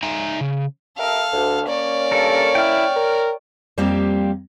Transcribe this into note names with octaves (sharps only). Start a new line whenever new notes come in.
D#4 E5 G#5 A#5
C#3
G4 A4 A#4 E5 F5
D2
A#3 C#4 C#5 D5
G2 A4 A#4
E4 G5 F6
A#4
F2 G3 A#3 C4 G4 F5